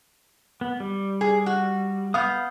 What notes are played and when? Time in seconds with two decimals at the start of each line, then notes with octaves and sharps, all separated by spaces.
0.61 B3
0.80 G3
1.21 G#4
1.46 F#4
2.14 B3 F5 D#6 G6